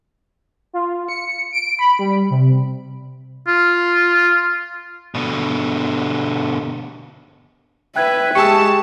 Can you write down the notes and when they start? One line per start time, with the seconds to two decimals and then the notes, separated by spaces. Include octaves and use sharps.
0.73 F4
1.09 C#7
1.52 D7
1.79 B5
1.99 G3
2.30 C3
3.47 F4
5.15 B2 D3
7.96 B4 E5 G5 F#6 G#6
8.35 G#3 G4 G#4 G5 A5 C#6 E6 C#7